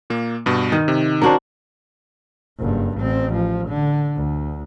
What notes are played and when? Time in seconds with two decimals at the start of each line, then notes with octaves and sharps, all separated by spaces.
0.10 A#2 A#3
0.46 G2 B2
0.72 D#3
0.88 C3
1.22 C#4 D4 F#4 A#4 C5
2.59 F#1 G2
2.99 A1 C4
3.33 F3
3.68 D3
4.17 D2